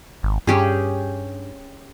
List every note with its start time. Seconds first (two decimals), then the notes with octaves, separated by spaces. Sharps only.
0.23 G#1
0.47 G2 C#4 G4 G#4